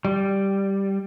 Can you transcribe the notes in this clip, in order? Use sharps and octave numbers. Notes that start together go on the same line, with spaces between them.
G3